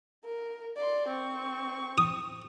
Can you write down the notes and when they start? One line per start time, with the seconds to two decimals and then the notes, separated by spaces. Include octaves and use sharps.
0.24 A#4
0.77 D5 C6
1.08 C4 C#6
1.98 D#6